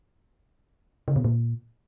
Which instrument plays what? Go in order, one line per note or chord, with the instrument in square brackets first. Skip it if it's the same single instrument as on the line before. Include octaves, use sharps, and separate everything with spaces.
[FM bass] C#3
B2
A#2